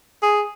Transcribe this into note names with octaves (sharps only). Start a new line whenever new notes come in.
G#4